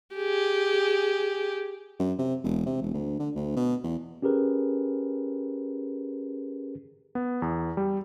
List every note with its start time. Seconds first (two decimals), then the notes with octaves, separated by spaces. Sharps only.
0.16 G4 G#4
1.99 F#2
2.19 C3
2.44 E1
2.66 C3
2.81 E1
2.94 D2
3.19 D3
3.35 D2
3.56 B2
3.83 E2
4.22 C#4 G4 G#4 A#4 B4
7.15 B3
7.42 E2
7.77 G3